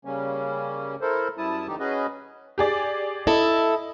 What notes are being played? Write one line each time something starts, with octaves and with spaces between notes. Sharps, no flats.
C#3 G3 A#3 C#4
E4 A4 A#4 C5
F#2 G3 E4 A5 D#6
D3 E3 D#4 G4
C#4 F#4 G#4 B4 D#5
G4 G#4 D5
E4 A4 D#5